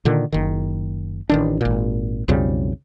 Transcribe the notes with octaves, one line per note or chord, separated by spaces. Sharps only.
A#2 D3 D#3
F#1 D#3
A1 D#3 D4
G#1 A#2
B1 F2 C#3 G3